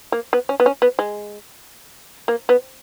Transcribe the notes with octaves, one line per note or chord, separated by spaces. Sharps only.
A#3
B3
C#4
B3
C#4
B3
G#3
A#3
B3